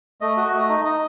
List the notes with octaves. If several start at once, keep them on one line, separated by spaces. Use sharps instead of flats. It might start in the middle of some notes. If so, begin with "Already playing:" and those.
A3 D#5
F#4
A3 D#5
D#4
D#4 D#5